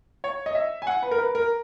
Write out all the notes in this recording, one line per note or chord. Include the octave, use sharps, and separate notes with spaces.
C#5
D#5
E5
G#5
F#5
B4
A#4
B4
A#4